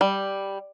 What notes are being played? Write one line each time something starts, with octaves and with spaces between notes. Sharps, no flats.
G3